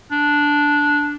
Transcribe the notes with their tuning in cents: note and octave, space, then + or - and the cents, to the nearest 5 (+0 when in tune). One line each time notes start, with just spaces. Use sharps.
D4 -5